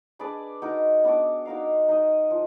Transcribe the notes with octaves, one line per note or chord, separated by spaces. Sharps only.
D4 G#4 B4 D5
D#4 F#4 A#4
B3 D4 F#4 D5
D#4 F#4 A#4 F5
D#4 A#4 D#5
F3